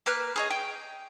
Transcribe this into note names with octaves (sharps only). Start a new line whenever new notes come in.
A#3 B4 F6 F#6
G#4 C#5 D#5
G5